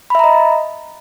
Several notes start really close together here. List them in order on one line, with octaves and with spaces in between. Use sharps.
B5 E5 A#5 D#5